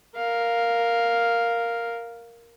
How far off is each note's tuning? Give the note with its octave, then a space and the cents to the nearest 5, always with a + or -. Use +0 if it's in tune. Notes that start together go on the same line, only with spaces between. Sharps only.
A#4 +0 F5 +0